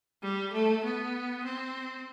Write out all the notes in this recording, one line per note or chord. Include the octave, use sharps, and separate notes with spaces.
G3
A3
B3
C4